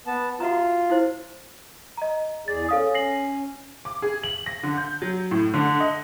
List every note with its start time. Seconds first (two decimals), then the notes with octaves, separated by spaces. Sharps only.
0.07 B3 A5
0.40 F4 F#4 E5 A#5
0.90 E4 C5
1.97 D#5 A#5
2.48 E2 G#4 D5 A6
2.69 C#4 A4 F5 D#6
2.94 A#6 C7 F#7
3.85 D6
4.02 G#4
4.24 F#7
4.46 A#6
4.63 D3
4.78 G6
5.02 F#3
5.31 A2
5.54 D3
5.80 D#5